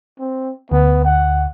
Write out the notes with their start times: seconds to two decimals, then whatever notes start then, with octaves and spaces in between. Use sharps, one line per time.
0.19 C4
0.72 D2 B3
1.04 F#5